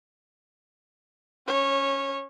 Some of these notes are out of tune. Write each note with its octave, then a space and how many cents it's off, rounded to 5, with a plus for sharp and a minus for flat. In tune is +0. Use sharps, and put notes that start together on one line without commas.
C#4 +0 C#5 -20